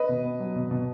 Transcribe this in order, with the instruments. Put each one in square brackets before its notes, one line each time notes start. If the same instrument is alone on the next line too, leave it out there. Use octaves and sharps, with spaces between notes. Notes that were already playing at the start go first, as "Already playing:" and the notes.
Already playing: [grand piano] B4 D#5
B2
B3
F#3
B2
B2